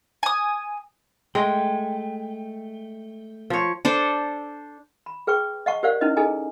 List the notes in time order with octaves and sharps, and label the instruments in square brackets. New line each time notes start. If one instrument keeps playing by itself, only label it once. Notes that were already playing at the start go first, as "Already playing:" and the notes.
[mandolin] G#5 D#6
[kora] G#3 [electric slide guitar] A3 G5
[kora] F3 C#5
[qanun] D4 A4 C5
[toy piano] B5
G#4 B4 G5 C#6
D#5 F5 F#5 A5 C#6
G4 A#4 C5 D5 F5 F#5
C#4 D#4 E4 B4 D#5
D#4 G#4 A4 D#5 G#5 A#5